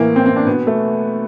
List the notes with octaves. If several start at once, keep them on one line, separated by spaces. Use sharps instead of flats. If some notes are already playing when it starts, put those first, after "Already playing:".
Already playing: A2 E3 A#3
A2 E3 C4
C4
D4
B2 B3
A3